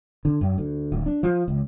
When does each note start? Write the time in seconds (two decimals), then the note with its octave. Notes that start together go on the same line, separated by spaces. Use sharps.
0.25 D3
0.41 F#2
0.58 D2
0.92 D1
1.06 D4
1.23 F3
1.48 C#2